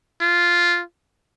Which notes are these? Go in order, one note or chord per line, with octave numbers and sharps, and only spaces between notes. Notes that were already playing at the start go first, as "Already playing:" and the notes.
F4